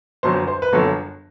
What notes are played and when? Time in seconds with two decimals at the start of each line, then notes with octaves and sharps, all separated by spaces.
0.23 G1 F#2 F#3 C5
0.48 C5
0.62 B4
0.73 G1 F#2 F#3 A4